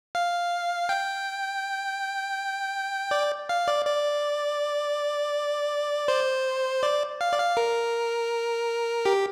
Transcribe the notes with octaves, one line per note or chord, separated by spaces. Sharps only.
F5
G5
D5
F5
D5
D5
C5
D5
F5
D5
F5
A#4
G4